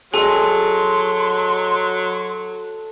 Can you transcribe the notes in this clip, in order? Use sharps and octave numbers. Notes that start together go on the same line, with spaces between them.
F#3 G#4 A4 D#5 G#5 C6